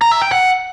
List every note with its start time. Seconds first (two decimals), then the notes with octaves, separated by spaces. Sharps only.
0.01 A#5
0.11 E5
0.22 G5
0.32 F#5